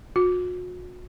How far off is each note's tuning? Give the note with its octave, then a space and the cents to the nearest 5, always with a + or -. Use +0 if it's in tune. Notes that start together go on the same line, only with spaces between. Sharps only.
F#4 -40